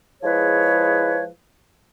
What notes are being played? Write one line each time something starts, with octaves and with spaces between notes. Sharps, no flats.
F3 G#3 E4 G#4 B4 C#5